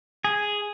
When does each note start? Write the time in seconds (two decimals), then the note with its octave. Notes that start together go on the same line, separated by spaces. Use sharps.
0.25 G#4